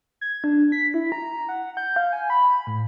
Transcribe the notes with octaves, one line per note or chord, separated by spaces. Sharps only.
G#6
D4
B6
E4
A#5
F#5
G6
F5
G#5
B5
A2